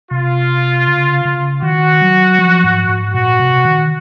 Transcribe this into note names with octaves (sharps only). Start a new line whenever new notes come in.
C3 F4
C#3
C#3
D#3 F#4
F#3
F3
G#2
G#2
A#2 F#4
C3
D#3